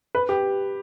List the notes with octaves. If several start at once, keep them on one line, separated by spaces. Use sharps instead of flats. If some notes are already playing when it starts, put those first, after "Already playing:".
B4
G4